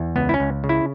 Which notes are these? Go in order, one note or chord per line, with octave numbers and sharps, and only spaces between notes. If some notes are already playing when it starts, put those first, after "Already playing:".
Already playing: E2
C#2 B3
E4
C#4
C#2
C#3
E4